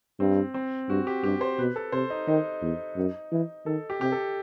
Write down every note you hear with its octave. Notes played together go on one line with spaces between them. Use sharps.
G2 C4
C4
G2 F#4
G4
G2 G4
C5
B2 B4
A4
C3 C5
D#4
D#3 D#4
E2
F#2
E3
D#3 A4
G4
C3 G4
A4